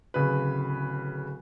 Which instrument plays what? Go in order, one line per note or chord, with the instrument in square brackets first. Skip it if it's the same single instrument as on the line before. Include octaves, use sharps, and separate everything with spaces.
[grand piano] D1 C#3 B4